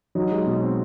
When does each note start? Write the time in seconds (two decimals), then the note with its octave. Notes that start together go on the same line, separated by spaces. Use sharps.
0.15 F#3 D#4
0.31 G#3
0.46 B2
0.62 C4